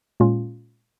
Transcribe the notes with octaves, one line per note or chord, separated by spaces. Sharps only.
A#2 G#3 C#4 F4